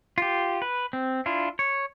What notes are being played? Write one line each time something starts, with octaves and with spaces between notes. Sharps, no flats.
F4 G4
B4
C4
D4 E4 F4
C#5